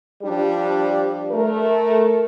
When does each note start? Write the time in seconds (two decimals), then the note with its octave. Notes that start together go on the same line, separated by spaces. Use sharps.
0.23 F3 G3 D4 G4
1.31 A3 A#4